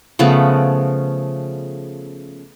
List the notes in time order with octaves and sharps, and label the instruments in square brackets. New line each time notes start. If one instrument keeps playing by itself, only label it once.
[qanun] C#3 F3 A3 B3